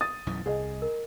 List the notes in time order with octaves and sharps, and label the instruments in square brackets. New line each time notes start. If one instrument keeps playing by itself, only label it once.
[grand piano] D#6 A6
[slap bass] B1 F#2 E3
[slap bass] C2 [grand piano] G#4 D#5
[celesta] A#4